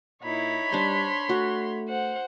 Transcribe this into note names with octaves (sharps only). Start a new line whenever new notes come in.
A#2 D#4 E4 C#5 B5
G3 D4 C5 C6
A3 F#4
C5 F#5